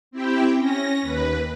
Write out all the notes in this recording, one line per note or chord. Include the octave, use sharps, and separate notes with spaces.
C4 E4 G4 G5
C#4 A#6
D#2 B4